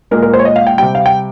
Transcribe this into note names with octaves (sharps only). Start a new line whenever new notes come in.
A#2 G#3 A#4
A#4
C5
C#5
D#5
F5
G5
C3 G3 G5
F5
G5